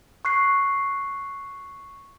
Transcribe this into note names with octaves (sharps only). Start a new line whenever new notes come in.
C#6 F#6 C7